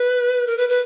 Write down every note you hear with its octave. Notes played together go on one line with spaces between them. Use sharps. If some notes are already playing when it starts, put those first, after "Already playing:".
Already playing: B4
A#4
B4
B4